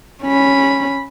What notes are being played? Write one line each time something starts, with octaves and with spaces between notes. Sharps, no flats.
C#4 B5